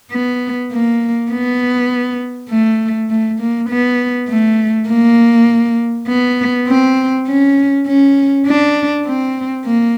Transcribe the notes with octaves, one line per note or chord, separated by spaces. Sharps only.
B3
A#3
B3
A3
A3
A#3
B3
A3
A#3
B3
C4
C#4
C#4
D4
C4
A#3